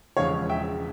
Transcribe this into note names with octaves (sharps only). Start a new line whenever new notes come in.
E1 E2 C#3 F3 G#3 C#5 F5
E5 G5